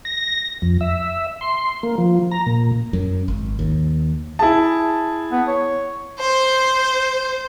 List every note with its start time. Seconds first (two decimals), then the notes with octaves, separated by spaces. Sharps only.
0.05 A#6
0.62 F2
0.81 E5
1.41 C6
1.83 A#3
1.98 F3
2.31 A#5
2.46 A#2
2.93 F#2
3.28 G#1
3.59 D#2
4.39 E4 G#4 A5
5.32 B3
5.48 C#5
6.18 C5